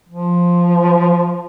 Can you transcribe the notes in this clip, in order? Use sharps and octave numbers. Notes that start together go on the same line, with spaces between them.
F3